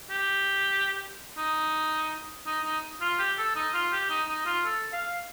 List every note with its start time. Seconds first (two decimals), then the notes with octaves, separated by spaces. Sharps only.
0.10 G4
1.38 D#4
2.46 D#4
2.65 D#4
3.01 F4
3.19 G4
3.38 A4
3.56 D#4
3.74 F4
3.92 G4
4.10 D#4
4.29 D#4
4.46 F4
4.65 A4
4.93 F5